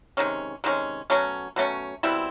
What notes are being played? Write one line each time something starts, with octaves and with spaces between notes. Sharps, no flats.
C3 D#3 G#3 C#4
C3 D#3 G#3 C#4
B2 F#3 A3 C#4
B2 F#3 A3 C#4
B2 G3 C4 E4